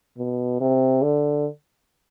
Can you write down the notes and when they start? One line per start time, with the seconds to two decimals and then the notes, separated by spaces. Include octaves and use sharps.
0.18 B2
0.61 C3
1.02 D3